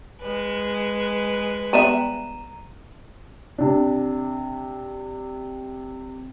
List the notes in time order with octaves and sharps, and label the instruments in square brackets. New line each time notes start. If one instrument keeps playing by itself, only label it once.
[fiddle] G#3 B4
[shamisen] G3 B3 E5 [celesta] A#5 D#7 E7
[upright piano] C3 D4